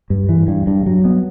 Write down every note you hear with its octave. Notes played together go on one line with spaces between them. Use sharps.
G2
E3
G2
G2
F#3
B3